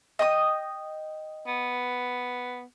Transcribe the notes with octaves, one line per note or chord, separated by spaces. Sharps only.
D#5 G5 D#6
B3